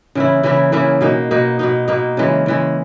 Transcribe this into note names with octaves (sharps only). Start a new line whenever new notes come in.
C#3 E3 A#3 E4
C#3 E3 A#3 E4
C#3 E3 A#3 E4
B2 A#3 D#4
B2 A#3 D#4
B2 A#3 D#4
B2 A#3 D#4
C#3 E3 G#3
C#3 E3 G#3